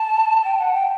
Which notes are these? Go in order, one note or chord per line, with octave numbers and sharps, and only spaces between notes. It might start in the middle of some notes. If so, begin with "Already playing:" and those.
Already playing: A5
G5
F#5
G5